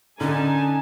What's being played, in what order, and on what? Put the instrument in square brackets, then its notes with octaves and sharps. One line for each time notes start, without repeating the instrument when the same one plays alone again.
[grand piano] D3 [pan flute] C#4 [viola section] D#4 G#5 A5